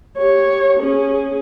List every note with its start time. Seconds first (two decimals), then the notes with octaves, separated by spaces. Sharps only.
0.18 G4 C#5
0.79 C#4 G#4